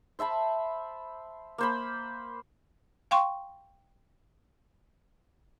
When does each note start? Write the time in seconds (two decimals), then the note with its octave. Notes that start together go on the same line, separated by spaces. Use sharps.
0.19 C5 E5 A5 B5
1.58 A#3 C5 B5
3.11 F5 G5 C6 C#6